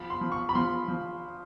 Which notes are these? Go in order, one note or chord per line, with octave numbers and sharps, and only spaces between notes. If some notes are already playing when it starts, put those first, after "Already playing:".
Already playing: F3 B5
C6
F3
C#6
B5
F3 C6
F3